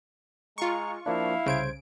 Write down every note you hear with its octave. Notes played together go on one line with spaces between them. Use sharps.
G#3 F4 A#5 C#6
F3 A#3 D4 E4 F5
C2 C#3 C5 G#6 D7